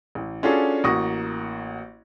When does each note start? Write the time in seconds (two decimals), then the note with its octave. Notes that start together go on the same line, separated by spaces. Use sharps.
0.15 A1
0.43 C#4 D4 F4 F#4 G#4 A4
0.84 A1 A#3 F#4 C#6 D#6 A#6